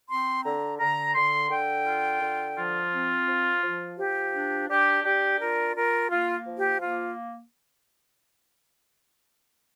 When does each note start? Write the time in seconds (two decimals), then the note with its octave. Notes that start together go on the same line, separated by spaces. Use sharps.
0.08 C4 C6
0.44 D3 A#5
0.79 D3 A#5
1.14 D3 C6
1.50 D3 G5
1.85 F4
2.21 D3
2.56 F3 F4
2.92 C4
3.27 F3
3.63 F3
3.98 F3 G4
4.33 D4
4.69 D4 G4
5.04 D4 G4
5.39 F4 A#4
5.74 F4 A#4
6.10 A#3 F4
6.46 F3
6.57 G4
6.81 A#3 F4